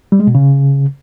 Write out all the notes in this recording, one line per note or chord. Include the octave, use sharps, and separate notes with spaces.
G3
G#3
B2
C#3